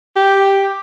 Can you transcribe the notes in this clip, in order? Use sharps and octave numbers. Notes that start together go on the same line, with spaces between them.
G4